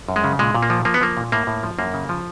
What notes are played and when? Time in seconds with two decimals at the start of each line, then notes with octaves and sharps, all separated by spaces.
0.09 F#2
0.16 G#3
0.24 C#3
0.39 A#2 G#3
0.55 A#2
0.63 A#3
0.70 F3
0.85 F3 A#3
0.94 B3
1.01 F3 A#3
1.17 A#2
1.32 A2 A#3
1.47 A2
1.63 F3
1.79 F#2 A#3
1.94 C#3
2.09 F3